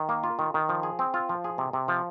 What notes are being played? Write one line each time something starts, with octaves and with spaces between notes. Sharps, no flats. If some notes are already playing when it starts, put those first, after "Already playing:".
Already playing: D#3
A#3
F4
D#3
D#3
F3
G#4
C4
F4
F3
G#4
C3
C3
F3